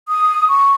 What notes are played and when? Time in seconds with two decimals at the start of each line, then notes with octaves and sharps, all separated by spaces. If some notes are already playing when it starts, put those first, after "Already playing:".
0.08 D#6
0.49 C#6